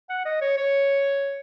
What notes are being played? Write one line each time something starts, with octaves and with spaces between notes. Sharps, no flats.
F#5
D#5
C#5
C#5